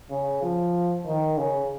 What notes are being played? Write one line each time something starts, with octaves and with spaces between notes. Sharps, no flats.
C#3
F3
D#3
C#3